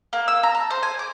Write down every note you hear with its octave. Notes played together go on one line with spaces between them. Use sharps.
A#3
E6
A#5
A5
C5
G#5
D6